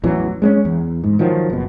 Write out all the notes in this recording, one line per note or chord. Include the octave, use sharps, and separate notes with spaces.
A1 E2 E3 F#3
G#3 C4 C#4
E2
G#2
D#3 F3 F#3
F#1 B2